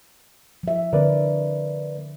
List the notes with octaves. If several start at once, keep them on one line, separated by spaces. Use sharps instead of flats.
F3 E5
D3 C4 A#4 B4 D5